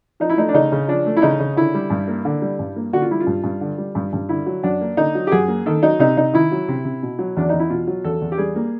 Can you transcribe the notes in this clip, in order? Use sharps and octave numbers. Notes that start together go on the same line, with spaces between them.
F3 D#4
E4
A3 D#4
D4
C#3 D#4
C#3
F3 D4
A3
E4
C#3 D#4
C#3
D3 E4
G3
G2
A#3
D3
G3
G2
A#3
D3 F#4
F4
G3 E4
F4
G2
G2
D3
G3
G2
G2
D3 E4
F#3
F#2 D4
A#3
D3 D#4
F#3
G4
F#2 G#4
A#3
D#3 A4
F#3 D#4
C3 D#4
C3 D#4
D#3 E4
F#3
C3
C3
B2
F#3
E2 D4
E2 D#4
E4
B2 F4
F#3
E2 A4
E2
G4
G3 G#4
A#3